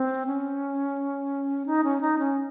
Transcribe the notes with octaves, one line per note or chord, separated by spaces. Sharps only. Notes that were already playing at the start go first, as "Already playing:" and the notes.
Already playing: C4
C#4
D#4
C#4
D#4
C#4